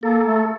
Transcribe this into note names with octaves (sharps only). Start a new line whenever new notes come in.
A#3 A4
A3